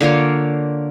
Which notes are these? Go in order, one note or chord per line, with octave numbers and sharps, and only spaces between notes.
D3 A#3 F4 C#5